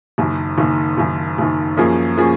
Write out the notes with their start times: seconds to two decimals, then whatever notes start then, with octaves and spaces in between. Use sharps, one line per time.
0.18 F#1 F#2 D#3
0.58 F#1 F#2 D#3
0.98 F#1 F#2 D#3
1.38 F#1 F#2 D#3
1.77 F#2 F3 A#3 C#4 G#4
2.18 F3 A#3 C#4 G#4